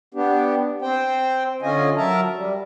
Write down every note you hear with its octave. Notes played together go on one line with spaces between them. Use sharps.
B3 D4 G4
C4 C5 G5
D3 C#4 F4 D#5 G#5
F#3 A#4 E5 A5 A#5
G3